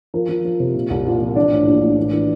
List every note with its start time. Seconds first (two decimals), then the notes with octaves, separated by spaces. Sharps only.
0.14 F3 A#4
0.29 F3
0.45 F3
0.60 C3
0.74 A#2
0.90 C2
1.06 A#2
1.21 F3
1.36 E3 D4 D5
1.52 A2
1.67 A#1
1.82 A2
1.98 E3
2.13 E3